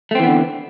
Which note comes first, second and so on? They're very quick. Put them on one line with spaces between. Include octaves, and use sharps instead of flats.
A3 C4 E3 B3 D3